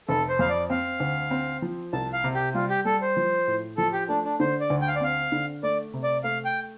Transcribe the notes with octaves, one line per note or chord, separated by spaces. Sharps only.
F1 A4
C5
F2 F5
D5
C4 F5
D2
C4
F3
C2 A5
F5
C3
G4
G3 F4
G4
G3 A4
C5
F3
A2
F3 A4
G4
A3 D4
D4
D3 C5
D5
D2
G5
F5
D5
C4 F5
D3
A3 D5
C3
D5
A3 F5
G5